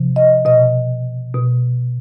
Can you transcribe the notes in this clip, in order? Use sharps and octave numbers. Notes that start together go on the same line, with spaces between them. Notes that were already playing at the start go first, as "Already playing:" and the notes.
Already playing: C3 F3
D#5
B2 D#5
B2